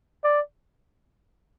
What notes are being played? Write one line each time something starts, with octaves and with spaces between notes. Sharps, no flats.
D5